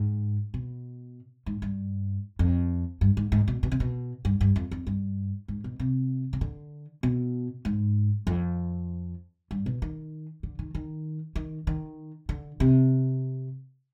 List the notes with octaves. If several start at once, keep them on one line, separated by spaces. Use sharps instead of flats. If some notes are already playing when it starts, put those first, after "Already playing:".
Already playing: G#2
B2
G#2
G2
F2
G2
G#2
G#2
B2
B2
C3
B2
G2
G2
F2
F2
G2
G#2
B2
C3
C3
D3
B2
G#2
F2
G2
B2
D#3
D3
D#3
D#3
D#3
D#3
D3
C3